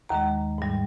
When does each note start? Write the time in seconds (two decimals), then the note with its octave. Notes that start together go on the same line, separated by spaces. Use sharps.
0.09 D#2 D#3 G#3 A#5
0.58 G#2 G3